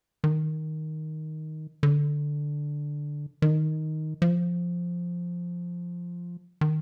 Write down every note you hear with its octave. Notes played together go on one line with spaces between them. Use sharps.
D#3
D3
D#3
F3
D#3